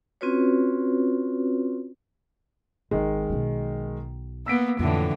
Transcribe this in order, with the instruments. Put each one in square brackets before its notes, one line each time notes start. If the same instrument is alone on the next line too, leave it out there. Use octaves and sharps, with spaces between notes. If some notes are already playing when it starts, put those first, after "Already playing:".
[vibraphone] C4 C#4 F4 F#4 B4 C#5
[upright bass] G#1 [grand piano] D#3 G#3
[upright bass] B1 B3
[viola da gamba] A#3 B3 [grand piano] E6 B6 D7
[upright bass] F2 F3 [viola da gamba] A2 D3 E3